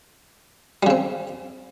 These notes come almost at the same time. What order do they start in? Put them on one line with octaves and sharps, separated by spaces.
G3 C#3 C4